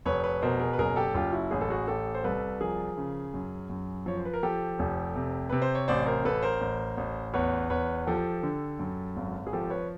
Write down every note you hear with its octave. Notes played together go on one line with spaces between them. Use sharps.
F1 B4 C#5
B4 C#5
B2 A#4 C5
G#4 A#4
B4
F#1 G#4 A#4
G4 A4
F#1 F4 G4
E4 F#4
A1 G#4
A4
F#4 G#4
A1 G4 A4
C5
C2 A4 B4
F3 G#4 A#4
C#3
F#2
F#2
F3 C#5
C5
B4
A#4
F3 G4 A4
F1
C3
C3 B4
C5
C#5
A1 C5 D5
A#4 C5
A1 A4 B4
A#4 C5
A1
A1
E2 B4 C#5
E2 B4 C#5
F3 G4 A4
D3
F#2
G#1
G#4
F3 G4 A4
B4 C#5